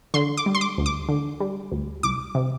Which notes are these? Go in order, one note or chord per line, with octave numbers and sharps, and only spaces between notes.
D3 C6
D6
G3
C6
D6
D2
D6
D3
G3
D2
C2 D6
C3